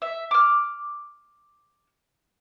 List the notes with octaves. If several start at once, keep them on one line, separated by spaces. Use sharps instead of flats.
E5
D6 F6